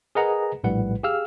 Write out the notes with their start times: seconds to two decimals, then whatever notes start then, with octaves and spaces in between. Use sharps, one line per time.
0.15 G#4 A#4 B4 D#5 F#5 A#5
0.64 A#1 A2 G3 B4 F#5
1.03 G4 G#4 F5 E6 F6